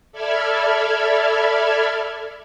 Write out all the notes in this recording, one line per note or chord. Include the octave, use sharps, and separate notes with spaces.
A4 D5 E5 B5 F6 G#6